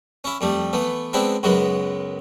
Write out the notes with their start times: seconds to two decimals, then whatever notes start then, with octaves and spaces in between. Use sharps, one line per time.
0.24 C#4 E4
0.41 F2 G3 A3
0.73 E3 A3 B3
1.13 G#3 B3 C4 D4 E4
1.43 C#2 F#2 F#3 G#3 B3